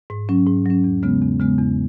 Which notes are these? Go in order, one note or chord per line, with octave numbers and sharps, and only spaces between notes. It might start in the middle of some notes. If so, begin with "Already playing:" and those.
G#2
F#3 C#4
G#2
F#3 C#4
E2
C#3 G#3 B3
E2
C#3 G#3 B3
E2